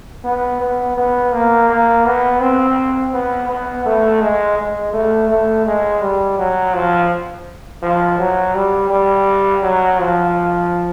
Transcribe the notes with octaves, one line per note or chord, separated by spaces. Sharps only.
B3
B3
B3
A#3
A#3
B3
C4
B3
B3
A3
G#3
G#3
A3
A3
G#3
G3
F#3
F3
F3
F#3
G3
G3
F#3
F3